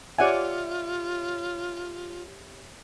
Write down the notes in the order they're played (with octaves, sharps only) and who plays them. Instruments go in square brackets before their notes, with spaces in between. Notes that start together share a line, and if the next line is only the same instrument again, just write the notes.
[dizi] F4 [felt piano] G4 C#5 E5 [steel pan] D5 F#5 G#5